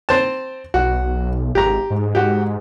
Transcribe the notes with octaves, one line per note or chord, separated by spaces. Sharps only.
C4 C5 A5
B1 F#4
G#1 G4 A#5
G#2
G#2 F#4 G4